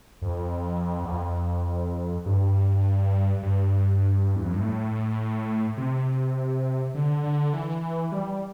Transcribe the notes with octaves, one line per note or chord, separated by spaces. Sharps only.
F2
E2
F2
G2
G2
E2
F2
G2
A2
C3
D3
D3
E3
G3